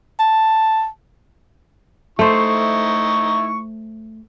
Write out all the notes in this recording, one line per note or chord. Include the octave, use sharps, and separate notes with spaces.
A5
A3 D#4 E4 C5 C#6